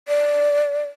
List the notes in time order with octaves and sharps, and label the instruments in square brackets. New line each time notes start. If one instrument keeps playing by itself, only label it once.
[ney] D5